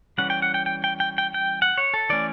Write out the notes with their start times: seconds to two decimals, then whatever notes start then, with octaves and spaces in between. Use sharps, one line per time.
0.18 E3 G3 C#4 F#5
0.30 G5
0.42 F#5
0.54 G5
0.66 G5
0.84 G5
1.00 G5
1.18 G5
1.34 G5
1.62 F#5
1.77 C#5
1.94 A4
2.09 E3 A3 C#4 D5